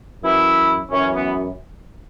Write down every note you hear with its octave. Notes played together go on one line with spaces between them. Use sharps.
F#2 E3 E4
F#2 E3 C#4
B3